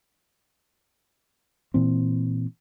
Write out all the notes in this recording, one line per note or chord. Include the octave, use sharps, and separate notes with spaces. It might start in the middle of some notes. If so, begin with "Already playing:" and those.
A#2 E3 C4